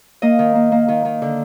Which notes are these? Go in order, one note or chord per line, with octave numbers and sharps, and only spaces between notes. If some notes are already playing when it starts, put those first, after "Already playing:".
A#3 D#5
D#3
A#3
A#3
D#3
D#3
D3